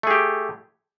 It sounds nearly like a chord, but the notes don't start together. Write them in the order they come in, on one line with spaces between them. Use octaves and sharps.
A3 G#4 G4